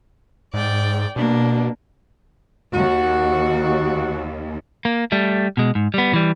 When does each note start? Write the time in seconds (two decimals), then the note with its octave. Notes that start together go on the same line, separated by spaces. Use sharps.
0.54 G#2 D5 G5
1.16 B2 A#3 D4
2.74 D#2 F#4
4.85 A#3
5.12 G3 A3
5.57 B2 G#3
5.75 G#2
5.94 G3 B3
6.13 E3 G3